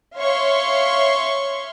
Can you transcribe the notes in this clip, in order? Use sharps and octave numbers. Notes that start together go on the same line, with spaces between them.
C#5 E5 F5 C6 C#6